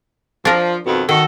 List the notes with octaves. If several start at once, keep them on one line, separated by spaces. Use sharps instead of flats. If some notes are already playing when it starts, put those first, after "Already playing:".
F3 D4 A#4
F2 B2 D#3
D#3 F#4 A4